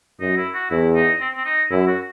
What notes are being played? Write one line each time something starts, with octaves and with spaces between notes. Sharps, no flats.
F#2 D#4
E4
F#4
E2 E4
D#4
C4
C4
D#4
F#2 E4
F#4